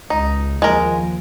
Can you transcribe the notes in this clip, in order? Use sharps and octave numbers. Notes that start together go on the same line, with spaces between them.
C#2 D#4
D#2 F3 G#3 A#4